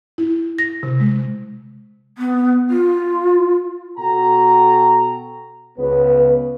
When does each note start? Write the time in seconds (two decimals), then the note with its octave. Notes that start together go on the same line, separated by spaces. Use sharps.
0.18 E4
0.58 A#6
0.83 C3
1.00 G#3
2.18 B3
2.70 F4
3.98 B2 F#4 A4 G5 A#5
5.79 C#2 B3 B4